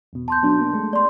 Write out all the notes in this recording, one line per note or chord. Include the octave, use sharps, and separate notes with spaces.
E2 B2
A5 C6 G6
F#3 B3 D4
A#3
G#3 A3
D5 C6